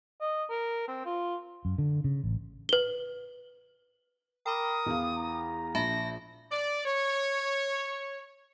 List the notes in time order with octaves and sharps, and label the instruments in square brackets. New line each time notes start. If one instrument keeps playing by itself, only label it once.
[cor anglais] D#5
A#4
C4
F4
[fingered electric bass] F#2
D3
C#3
A1
[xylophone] B4 G7
[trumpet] A#4 [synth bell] G5 B5 D6 [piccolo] D#6
[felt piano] E2 E3 F5
[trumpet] A#5
[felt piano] A#1 [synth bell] E5 A5 B5 [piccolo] A#6
[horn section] D5
C#5